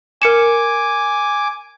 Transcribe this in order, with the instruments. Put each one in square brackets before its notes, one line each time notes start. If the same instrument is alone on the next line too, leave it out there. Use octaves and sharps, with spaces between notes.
[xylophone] A#4 C#7 E7 [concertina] G#5 D6